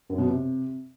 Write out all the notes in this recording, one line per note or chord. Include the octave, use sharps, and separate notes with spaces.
F#2
B2
C3